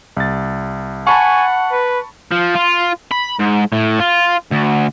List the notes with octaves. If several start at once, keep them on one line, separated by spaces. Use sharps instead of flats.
C2 A6
F#5 G#5 A5 B5 C#6
B4
F3
F4
B5
G#2
A2
F4
D2